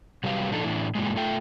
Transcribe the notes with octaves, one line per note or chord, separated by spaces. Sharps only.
C3 F#3 G3 G4 B4 F5
A#2 D3 F3 D4 D#4 A4
A2 E3 D4 E4
G2 A#2 C#3 E3 G3 G#3
A3 F4 A4 E5 G5